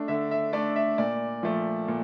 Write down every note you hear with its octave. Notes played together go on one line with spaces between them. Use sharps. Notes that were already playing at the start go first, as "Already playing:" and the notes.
Already playing: A3 D4
D3 E5
E5
A3 D4 D5
E5
A#2 D5
F3 A3
A#2